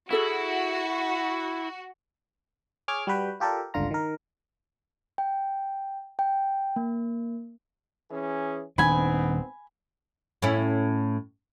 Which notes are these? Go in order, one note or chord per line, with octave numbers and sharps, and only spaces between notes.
E4 F#4 G#4 A4 E5
G#4 C#5 D6 F6 G#6
G3 F#4 B4 G5
F4 G4 A4 A#4 D5
G1 C#2 D3 F4 A#5
D#3 A#4
G5
G5
A#3
E3 C#4 G#4
D#1 G#2 D#3 B3 C4 D4 G#5 B5
A2 C#4 E4